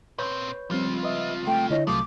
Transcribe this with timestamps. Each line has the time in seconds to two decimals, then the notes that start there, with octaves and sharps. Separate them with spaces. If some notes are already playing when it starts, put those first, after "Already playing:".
0.18 A#2 C4 B4 C#5 G6
0.70 C#2 F3 G3 C4 F4
1.03 B4 D#5 E5
1.47 A3 G5
1.70 D3 E4 C#5 D#5
1.87 C2 F3 F#3 A3 D6